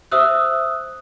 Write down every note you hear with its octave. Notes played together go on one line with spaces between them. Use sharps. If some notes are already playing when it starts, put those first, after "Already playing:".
C5 E5 D#6 E6 F#6